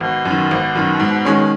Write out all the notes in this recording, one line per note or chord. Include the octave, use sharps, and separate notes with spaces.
G#1 B2
F#2
D#3
G#1
F#2 D#3
G#2
D#3 G#3 C#4